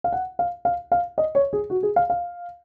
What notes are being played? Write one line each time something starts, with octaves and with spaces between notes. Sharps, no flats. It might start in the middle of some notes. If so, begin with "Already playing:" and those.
F5
F#5
F5
F5
F5
D#5
C#5
G#4
F#4
G#4
F5
F5